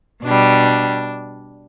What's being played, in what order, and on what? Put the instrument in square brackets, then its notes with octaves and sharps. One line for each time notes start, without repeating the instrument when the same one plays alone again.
[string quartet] B2 G3 D4